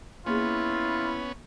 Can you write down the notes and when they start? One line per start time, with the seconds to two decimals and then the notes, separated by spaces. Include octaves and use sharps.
0.26 A#3 B3 C#4 E4 F4 G#4